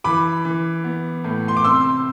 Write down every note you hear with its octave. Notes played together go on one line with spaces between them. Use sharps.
E3 B5 D6
E3
B3
A2
C6
D6
C3 C6 E6